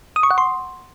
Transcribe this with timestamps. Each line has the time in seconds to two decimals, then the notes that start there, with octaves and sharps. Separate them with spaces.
0.16 D#6
0.23 C#6
0.31 F#5
0.38 C6